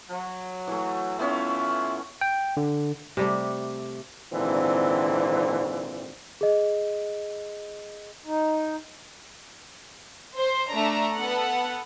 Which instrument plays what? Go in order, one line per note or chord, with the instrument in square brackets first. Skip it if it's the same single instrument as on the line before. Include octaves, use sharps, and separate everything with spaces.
[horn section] F#3
[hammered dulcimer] E3 A3
[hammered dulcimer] A3 B3 C#4 [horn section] E4 F4
[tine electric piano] G5
D3
[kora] C3 G3 A3
[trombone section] G#1 A#2 D3 E3 C4
[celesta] G#4 D#5
[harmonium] D#4
[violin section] C5
A3 D4 A#5
B3 A4 F#5